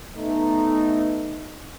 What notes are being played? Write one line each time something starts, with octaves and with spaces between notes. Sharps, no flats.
A3 B3 D#4